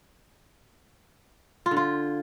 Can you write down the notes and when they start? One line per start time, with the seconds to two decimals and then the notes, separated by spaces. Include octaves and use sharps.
1.66 F4
1.71 D3
1.77 F4